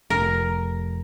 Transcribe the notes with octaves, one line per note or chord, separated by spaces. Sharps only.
F1 A#4